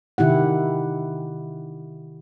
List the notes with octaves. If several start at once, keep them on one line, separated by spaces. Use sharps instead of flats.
C3 D#3 E4 G4 F#5